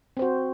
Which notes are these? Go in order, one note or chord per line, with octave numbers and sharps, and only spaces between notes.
C4 F#4 C5